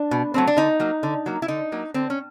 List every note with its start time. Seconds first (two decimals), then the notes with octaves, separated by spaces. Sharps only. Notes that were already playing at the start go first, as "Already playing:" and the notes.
Already playing: D4
0.11 B2
0.34 F#3 A3 C4
0.47 D4
0.57 D3 D#4
0.80 F#3 A#3
1.03 D3
1.26 F#3 A#3
1.42 E4
1.48 D3 D#4
1.72 F#3 A#3
1.94 D3 C4
2.10 C#4